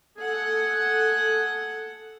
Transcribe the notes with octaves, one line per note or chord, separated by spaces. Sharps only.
G#4 A4 F#5